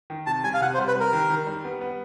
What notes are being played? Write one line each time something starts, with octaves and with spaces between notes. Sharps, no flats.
D#3
C3 A5
G3 G#5
F5
C3 F#5
C5
G3
B4
G3 A#4
D#3
D#3
G3
B3
B3